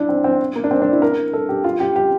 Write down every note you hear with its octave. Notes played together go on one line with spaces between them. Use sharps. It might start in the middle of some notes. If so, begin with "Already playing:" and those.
Already playing: D4 E4
C4
C4
A#3
D4
C4
D4
E4
A#4
A4
G4
F4
G4
G4